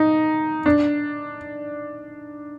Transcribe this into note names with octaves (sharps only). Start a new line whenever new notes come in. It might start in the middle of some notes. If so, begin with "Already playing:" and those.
Already playing: D#4
D4